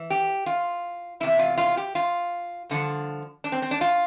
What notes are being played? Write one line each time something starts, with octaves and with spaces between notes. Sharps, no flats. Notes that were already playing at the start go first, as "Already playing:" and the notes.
Already playing: E3
G4
F4
E2 C3 E3 E4
F4
F4
G4
F4
G2 D3 F3
D4
C4
C4
D4
F4